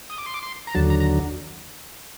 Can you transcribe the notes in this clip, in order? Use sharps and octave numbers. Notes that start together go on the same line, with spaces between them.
D#6
D6
C6
D6
C6
A#5
D#2 D3 F#3 A5
A#5
A#5